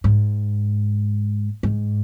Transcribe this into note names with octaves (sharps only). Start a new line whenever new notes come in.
G#2
G#2